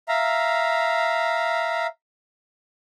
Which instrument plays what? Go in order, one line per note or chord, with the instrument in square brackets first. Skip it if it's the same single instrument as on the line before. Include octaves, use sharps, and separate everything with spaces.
[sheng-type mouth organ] E5 F5 A#5